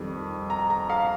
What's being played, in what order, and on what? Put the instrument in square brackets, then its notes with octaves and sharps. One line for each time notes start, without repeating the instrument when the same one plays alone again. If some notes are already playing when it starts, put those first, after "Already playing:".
Already playing: [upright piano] F2 D#3 G3
A#5
A#5
F5